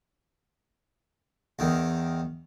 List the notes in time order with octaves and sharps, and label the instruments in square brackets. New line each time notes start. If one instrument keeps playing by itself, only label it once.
[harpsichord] E2 D#3